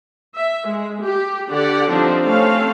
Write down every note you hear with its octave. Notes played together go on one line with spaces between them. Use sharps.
E5
G#3
G4
D3 G4 D5 F#5
F3 G3 C4 D4 D#4
A3 C4 C#4 A4 F5